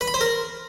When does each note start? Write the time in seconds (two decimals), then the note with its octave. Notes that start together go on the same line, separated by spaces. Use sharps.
0.01 B4
0.08 B5
0.14 C5
0.21 A#4